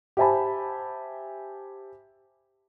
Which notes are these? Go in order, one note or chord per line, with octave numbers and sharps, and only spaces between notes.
G4 C5 E5 G#5 A5 B5